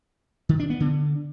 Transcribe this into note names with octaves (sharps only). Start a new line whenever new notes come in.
D#3
D4
B3
D3